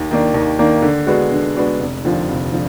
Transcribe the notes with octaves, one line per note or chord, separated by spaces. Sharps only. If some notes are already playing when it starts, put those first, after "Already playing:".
Already playing: D#2
D#3 A#3 D4
D#2
D#3 A#3 D4
D3
G#3 B3 D4 F#4
D3
G#3 B3 D4 F#4
F1
D#2 D3 F3
F1
D3 F3